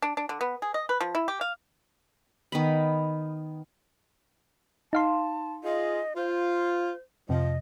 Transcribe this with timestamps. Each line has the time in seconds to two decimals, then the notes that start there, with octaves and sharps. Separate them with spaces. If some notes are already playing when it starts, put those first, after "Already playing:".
0.02 D4
0.17 D4
0.29 D3
0.41 B3
0.62 G#4
0.74 D#5
0.89 B4
1.01 F3
1.15 E4
1.28 G4
1.41 F5
2.52 D#3 B3 B5
4.93 D#4 F5 A5 C6
5.64 F4 G#4 D#5
6.16 F4 C5
7.29 F2 C3 F3 D#5